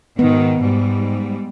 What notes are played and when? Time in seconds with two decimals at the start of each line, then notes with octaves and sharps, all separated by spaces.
0.19 G#2 B2 D#3 B3
0.59 G#2 G3